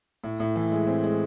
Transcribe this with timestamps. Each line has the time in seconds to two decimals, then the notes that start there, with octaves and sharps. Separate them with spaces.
0.24 A2
0.40 A2
0.56 E3
0.72 G#3
0.87 C4
1.04 G#3